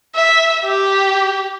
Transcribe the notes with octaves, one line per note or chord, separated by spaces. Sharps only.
E5
G4